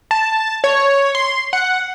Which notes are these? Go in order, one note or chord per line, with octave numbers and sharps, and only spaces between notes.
A5
C#5
C6
F#5